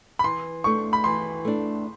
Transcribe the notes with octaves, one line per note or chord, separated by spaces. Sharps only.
B5
E3 C6
A3 D4 C#6
B5
E3 C6
A3 D4